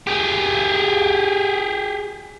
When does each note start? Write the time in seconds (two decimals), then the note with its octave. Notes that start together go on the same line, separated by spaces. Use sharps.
0.07 G4 G#4